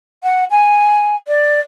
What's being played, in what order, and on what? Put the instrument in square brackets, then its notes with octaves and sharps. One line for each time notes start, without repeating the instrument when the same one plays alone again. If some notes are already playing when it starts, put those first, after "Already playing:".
[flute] F#5
G#5
D5